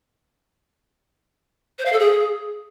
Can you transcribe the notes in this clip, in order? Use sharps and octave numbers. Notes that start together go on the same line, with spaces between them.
C5
F5
A4
G#4